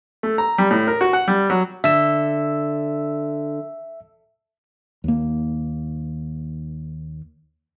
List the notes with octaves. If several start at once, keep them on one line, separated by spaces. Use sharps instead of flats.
A3
A#5
G3
A2
A#4
F#4
F#5
G3
F#3
D3 E5 E6
D#2 A#3